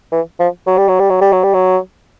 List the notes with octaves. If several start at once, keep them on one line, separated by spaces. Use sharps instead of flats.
E3
F3
F#3
G3
F#3
G3
F#3
G3
F#3
G3
F#3